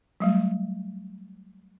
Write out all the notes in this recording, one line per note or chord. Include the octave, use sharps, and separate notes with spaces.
F#3 G3 A3